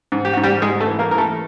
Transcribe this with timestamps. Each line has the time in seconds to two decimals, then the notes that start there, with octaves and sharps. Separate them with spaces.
0.12 G#2
0.25 G4
0.34 G#2 F#4
0.43 G3 G4
0.62 G#2 G#3 G#4
0.80 A3 A4
0.86 E3
0.99 A#3 A#4
1.11 E3 A#4
1.18 A3 A4